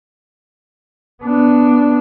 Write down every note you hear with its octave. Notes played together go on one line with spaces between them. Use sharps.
B3 D4